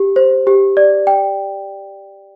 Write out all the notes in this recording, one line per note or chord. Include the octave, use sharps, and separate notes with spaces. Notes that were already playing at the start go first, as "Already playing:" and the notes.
Already playing: G4
C5
G4
D5
G5